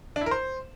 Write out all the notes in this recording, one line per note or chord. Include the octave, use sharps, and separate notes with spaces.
D4
E4
A#4
C5